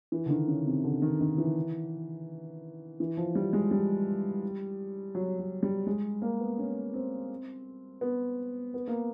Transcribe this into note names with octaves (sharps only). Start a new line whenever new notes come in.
E3
D3
D#3
C#3
C3
D3
D#3
D#3
E3
E3
F3
G3
G#3
G3
F#3
F#3
G3
G#3
A#3
B3
C#4
C4
B3
B3
A#3